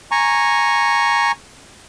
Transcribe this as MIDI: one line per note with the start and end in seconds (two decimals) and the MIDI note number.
0.11 1.32 80
0.11 1.32 82
0.11 1.32 85